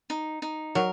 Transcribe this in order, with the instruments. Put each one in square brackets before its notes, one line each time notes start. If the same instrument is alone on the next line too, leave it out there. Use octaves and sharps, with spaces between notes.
[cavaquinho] D#4
D#4
[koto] F#3 [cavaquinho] A#4